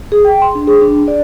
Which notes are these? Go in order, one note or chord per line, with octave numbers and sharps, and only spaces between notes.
G#4
G5
C6
D4
G#4
D4
D5